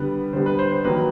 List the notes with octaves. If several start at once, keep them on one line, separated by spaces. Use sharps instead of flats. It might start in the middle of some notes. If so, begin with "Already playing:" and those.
Already playing: D3 G3 B3 B4
D3 G3 B3 C5
B4
C5
C5
D#3 F#3 A#3 B4